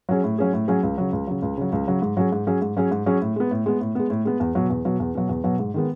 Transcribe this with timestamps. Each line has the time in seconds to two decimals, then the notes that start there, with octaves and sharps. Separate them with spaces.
0.09 F#3 C#4 G#4
0.24 A2
0.38 F#3 C#4 G#4
0.53 A2
0.68 F#3 C#4 G#4
0.83 C#2
0.98 C#3 F#3
1.13 C#2
1.27 C#3 F#3
1.42 C#2
1.57 C#3 F#3
1.72 C#2
1.87 C#3 F#3
2.02 G#2
2.17 F#3 C#4 G#4
2.32 G#2
2.47 F#3 C#4 G#4
2.62 G#2
2.77 F#3 C#4 G#4
2.91 G#2
3.06 F#3 C#4 G#4
3.21 A2
3.36 G#3 B3
3.51 A2
3.66 G#3 B3
3.80 A2
3.95 G#3 B3
4.10 A2
4.25 G#3 B3
4.40 E2
4.55 B2 F#3
4.70 E2
4.85 B2 F#3
5.00 E2
5.15 B2 F#3
5.29 E2
5.44 B2 F#3
5.59 G#2
5.74 D#3 G#3 B3